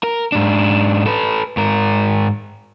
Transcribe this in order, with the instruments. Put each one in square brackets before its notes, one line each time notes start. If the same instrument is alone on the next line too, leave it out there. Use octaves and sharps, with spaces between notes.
[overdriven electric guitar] A#4
G#2 D4
A4 B4
G#2 A#4